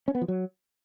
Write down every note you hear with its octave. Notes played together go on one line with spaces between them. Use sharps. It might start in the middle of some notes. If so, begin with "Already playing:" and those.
C#4
B3
F3
F#3